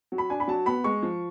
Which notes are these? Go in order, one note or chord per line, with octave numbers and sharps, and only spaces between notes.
F#3
B5
D4 G#5
B5
F#3 A5
B3 B5
G#3 C#6
F3